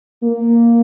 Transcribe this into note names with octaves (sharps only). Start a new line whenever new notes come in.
A#3